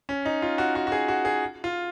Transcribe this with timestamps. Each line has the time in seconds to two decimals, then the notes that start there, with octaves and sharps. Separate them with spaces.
0.09 C#4
0.25 D#4
0.42 F4
0.58 F#4
0.75 F#4
0.87 F#4
0.92 G#4
1.08 F#4
1.25 G#4
1.64 F4